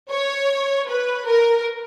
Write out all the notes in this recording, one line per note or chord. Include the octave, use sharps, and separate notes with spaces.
C#5
B4
A#4